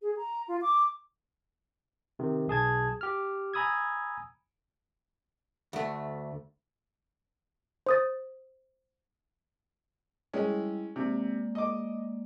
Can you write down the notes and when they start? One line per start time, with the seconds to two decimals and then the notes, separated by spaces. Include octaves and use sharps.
0.02 G#4
0.17 A#5
0.48 F4
0.62 D6
2.19 C3 D#3
2.48 B1 G#4 A5 G#6
3.01 G4 F6
3.54 G#5 A#5 B5 D#6 E6 G#6
5.73 D2 A3
7.86 C5 D#6 A6
10.33 G3 G#3 C#4 E4 G5
10.96 C3 G#3 A#3 D5
11.55 D#5 D6